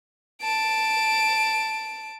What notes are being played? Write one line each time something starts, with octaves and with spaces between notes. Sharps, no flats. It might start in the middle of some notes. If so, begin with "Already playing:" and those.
A5 D7